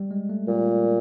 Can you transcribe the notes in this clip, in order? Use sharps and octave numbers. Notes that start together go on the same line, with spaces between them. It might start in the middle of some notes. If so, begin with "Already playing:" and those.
Already playing: G3
G#3
A3
A#2 G3